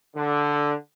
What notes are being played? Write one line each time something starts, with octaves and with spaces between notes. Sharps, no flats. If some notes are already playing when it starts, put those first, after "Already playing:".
D3